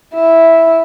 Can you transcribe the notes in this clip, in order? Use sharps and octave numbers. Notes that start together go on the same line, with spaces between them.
E4